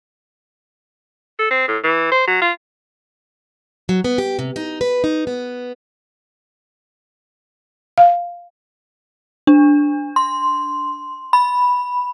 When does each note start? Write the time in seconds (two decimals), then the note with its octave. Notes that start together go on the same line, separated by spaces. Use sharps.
1.39 A4
1.51 C4
1.68 A2
1.84 E3
2.12 C5
2.27 F#3
2.41 F4
3.89 F#3
4.04 B3
4.18 G4
4.39 C3
4.56 D#4
4.81 B4
5.04 D#4
5.27 B3
7.98 F5
9.47 D4
10.16 C6
11.33 B5